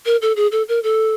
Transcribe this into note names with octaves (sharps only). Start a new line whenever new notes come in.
A#4
A4
G#4
A4
A#4
A4